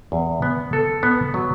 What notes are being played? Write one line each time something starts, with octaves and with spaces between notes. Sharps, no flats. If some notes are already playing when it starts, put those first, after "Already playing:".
E2
B3
A4
B3
F#3